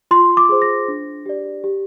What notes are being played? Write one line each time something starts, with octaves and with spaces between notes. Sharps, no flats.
F4 C6
D6
G#4 C5
A#6
D4
G4 D5
G4